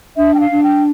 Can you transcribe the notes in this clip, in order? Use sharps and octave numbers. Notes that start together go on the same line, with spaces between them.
D4 E5
G5
F5
D4
G5